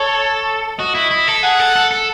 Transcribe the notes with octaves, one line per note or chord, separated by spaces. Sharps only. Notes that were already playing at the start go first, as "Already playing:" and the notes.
Already playing: A4 C#5
F#4 D#5
E4
E4
A4
G#4 F#5
A4
A4
A4